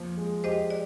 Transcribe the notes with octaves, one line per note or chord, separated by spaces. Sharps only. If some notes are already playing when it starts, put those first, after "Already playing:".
Already playing: F3 A#3
G#3
G4 C5 D#5
D5